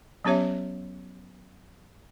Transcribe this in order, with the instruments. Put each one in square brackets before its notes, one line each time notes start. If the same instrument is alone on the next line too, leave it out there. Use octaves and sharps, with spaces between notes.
[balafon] F#3 B3 C#4 G4 C#5 E5